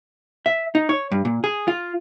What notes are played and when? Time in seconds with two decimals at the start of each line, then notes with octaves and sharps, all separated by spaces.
0.46 E5
0.75 D#4
0.89 C#5
1.12 G2
1.25 A#2
1.44 G#4
1.68 F4